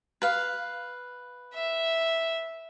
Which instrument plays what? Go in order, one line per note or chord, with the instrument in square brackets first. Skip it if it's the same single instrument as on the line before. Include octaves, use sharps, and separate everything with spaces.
[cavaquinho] B4 F5
[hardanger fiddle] E5